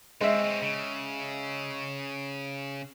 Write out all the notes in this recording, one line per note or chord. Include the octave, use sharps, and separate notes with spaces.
G#3 C4 C#4 E5
C#3